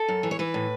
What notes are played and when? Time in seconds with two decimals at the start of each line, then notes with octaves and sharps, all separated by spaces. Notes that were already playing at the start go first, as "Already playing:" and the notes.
Already playing: A4
0.08 F#2
0.23 E3
0.31 C#5
0.39 E3 B4
0.54 A2